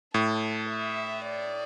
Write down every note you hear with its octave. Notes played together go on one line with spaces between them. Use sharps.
A2 A4
E5
D5